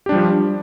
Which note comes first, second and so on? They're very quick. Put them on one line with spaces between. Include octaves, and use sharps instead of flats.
G4 D4 G3 F3